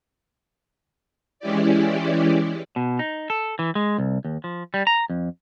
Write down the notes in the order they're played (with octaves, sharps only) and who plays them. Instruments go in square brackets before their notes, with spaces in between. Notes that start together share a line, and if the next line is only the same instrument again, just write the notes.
[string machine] E3 G#3 C#4 E4 G4 D5
[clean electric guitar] B2
D#4
A4
E3
G#3
C2
D#2
F3
G3
A#5
F2